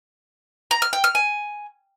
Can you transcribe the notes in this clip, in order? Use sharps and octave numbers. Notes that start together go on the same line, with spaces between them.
A#5
F6
G5
F6
G#5